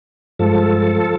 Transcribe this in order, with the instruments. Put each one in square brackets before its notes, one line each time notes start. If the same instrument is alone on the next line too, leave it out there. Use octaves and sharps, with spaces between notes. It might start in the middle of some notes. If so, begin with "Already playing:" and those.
[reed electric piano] G2 G#3 [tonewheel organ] F3 A4